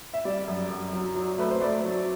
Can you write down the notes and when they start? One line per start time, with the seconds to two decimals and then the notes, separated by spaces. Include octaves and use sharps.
0.14 E5
0.25 G3 D5
0.47 F#2
0.70 F#2
0.93 F#3
1.16 F#3
1.38 A3 B4
1.50 C5
1.61 A3 D5
1.83 F#3